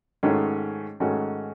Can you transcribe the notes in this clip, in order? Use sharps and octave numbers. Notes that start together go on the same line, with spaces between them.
G#2 D#3 A3 C#4 F#4
G#2 D#3 A3 C#4 F#4